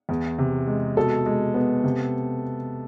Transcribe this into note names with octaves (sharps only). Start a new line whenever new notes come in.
E2
C3
G#3
B2 A4
G#3
B3
C3